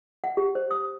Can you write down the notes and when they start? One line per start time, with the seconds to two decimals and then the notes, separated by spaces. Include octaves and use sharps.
0.24 F#5
0.37 G4
0.55 C5
0.71 D#6